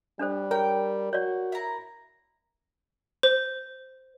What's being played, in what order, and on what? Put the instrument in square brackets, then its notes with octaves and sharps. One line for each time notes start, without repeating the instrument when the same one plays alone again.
[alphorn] G3 [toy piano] D4 A4 C5
[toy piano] G#4 C#5 [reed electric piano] A#4 [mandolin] G5
[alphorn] F#4 [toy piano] C#5 D5
[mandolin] E4 A#5
[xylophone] C5